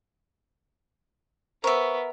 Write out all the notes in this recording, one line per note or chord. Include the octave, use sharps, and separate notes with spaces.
B3 A#4 C5 E5 C#6